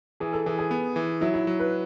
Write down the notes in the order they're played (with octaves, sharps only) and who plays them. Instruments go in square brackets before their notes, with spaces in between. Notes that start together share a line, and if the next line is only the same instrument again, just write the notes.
[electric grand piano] E3 [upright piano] G#4
[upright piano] A4
[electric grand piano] E3 [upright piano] G#4
[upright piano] G#4
[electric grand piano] B3
E3
[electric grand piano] F#3 [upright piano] E4
[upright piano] E4
[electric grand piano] F#3
[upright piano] B4